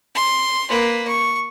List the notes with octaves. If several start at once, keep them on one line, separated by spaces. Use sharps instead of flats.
C6
A#3 B4
C#6